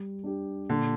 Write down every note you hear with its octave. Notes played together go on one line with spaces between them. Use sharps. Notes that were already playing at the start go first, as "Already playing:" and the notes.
Already playing: G3
D4 G4
A#2 D3